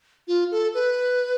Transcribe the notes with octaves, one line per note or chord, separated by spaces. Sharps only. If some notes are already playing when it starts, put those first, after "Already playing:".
F4
A4
B4